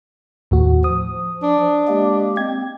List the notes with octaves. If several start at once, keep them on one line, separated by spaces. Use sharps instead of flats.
D#2 A2 F#4
F3 D#6
D4
G#3 A#3 G4
C4 G#6